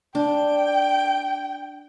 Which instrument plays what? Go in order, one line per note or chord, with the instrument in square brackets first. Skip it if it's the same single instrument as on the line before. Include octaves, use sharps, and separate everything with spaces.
[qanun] D4 [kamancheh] G5